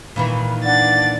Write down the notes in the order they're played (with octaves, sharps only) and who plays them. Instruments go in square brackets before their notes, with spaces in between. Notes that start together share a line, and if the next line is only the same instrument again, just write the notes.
[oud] A#2 D#3 E3 [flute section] B5
[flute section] D4 D5 F#5 [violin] A6